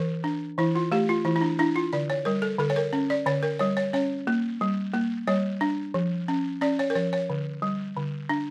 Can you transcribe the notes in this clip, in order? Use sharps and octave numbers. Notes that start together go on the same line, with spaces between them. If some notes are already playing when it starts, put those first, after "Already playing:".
Already playing: E3 A#4
D4
E3 E4
F4
A3 G4
F4
E3 E4
E4
D4
D4 E4
F4
D3 D5
C#5
G3 A#4
A4
D3 A4
C#5
A#4
C#4
D5
D3 C#5
A#4
G3 C#5
C#5
C#4 C#5
A#3
G3
A#3
G3 C#5
D4
F3
C#4
C#4 D5
C#5
A#4
F3 C#5
C#5
D3
G3
D3
D4